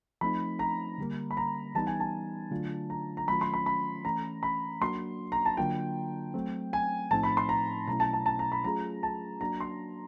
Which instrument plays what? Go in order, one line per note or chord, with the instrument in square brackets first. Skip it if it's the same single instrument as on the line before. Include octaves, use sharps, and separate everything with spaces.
[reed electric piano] F3 A3 C4 D#4 [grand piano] B5
[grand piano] A#5
[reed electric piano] D3 G3 A#3
[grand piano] B5
A#5
[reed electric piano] E3 G3 B3 D#4 [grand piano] A5
[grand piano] G#5
A5
[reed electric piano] D3 F#3 A3 D4 F4
[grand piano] A#5
A#5
[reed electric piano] D#3 F#3 A3 C#4 F4 [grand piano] B5
[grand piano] C6
B5
B5
[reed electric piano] E3 A3 C#4 [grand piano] A#5
[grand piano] B5
[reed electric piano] F#3 A#3 D4 F#4 [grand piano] C6
[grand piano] A#5
A5
[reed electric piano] D3 F#3 A#3 D4 F4 [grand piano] G5
[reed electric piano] F#3 A3 C4
[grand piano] G#5
[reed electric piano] A2 F3 A3 C4 D#4 [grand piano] A5
[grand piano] B5
C6
A#5
[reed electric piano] B2 F#3 A3 C#4 E4 [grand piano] A#5
[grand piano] A5
A5
A5
A#5
B5
[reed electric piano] F#3 A3 C#4 F4 G#4 [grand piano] A#5
[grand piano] A5
[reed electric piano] F#3 A#3 D4 F#4 [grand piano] A#5
[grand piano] C6